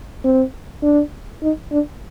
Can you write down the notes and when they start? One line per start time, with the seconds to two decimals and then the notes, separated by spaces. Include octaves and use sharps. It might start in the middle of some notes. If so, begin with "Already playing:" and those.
0.24 C4
0.83 D4
1.42 D#4
1.71 D4